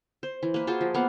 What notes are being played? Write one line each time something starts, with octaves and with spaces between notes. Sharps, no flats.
C5
E3
A#3 B4
F4 F#4 G#4 C5
F3
A#3 B3 F5 F#5